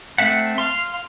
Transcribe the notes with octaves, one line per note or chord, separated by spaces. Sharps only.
A3 C4 E5 F#5
F5 C6